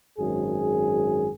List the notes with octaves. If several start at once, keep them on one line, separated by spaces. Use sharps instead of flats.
G#1 F#2 G#4